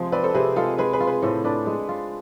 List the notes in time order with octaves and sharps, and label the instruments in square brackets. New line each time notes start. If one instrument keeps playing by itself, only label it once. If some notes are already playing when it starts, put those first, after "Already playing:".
Already playing: [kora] C3 F3 G#3
[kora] C4 [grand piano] B4 D5
[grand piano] A4 C5
[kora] C3 [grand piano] G#4 B4
[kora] G#3 [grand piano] F4 A4
[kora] G#3 [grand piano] G#4 B4
[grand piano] G#4 B4
[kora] F4
[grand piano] G#4 B4
[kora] A2 [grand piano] A4 C5
[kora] D4 [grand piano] B4 D5
[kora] G#3
F4